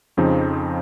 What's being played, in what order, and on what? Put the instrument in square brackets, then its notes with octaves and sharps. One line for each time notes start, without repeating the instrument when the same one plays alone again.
[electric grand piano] F2 C#3 F3 C4 D#4